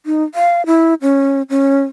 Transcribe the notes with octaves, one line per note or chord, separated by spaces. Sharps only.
D#4
F5
E4
C#4
C#4